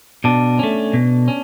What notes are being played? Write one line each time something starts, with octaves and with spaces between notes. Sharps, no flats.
B2 D4
A3 C#4
B2
C#4